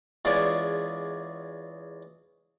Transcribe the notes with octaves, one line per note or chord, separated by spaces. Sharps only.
E2 G#3 C#4 F4 G#4 D5